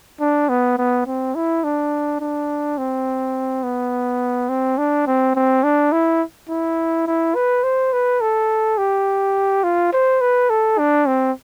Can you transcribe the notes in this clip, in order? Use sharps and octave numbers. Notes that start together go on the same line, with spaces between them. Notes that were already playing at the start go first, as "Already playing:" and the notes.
D4
B3
B3
C4
E4
D4
D4
C4
B3
C4
D4
C4
C4
D4
E4
E4
E4
B4
C5
B4
A4
G4
F4
C5
B4
A4
D4
C4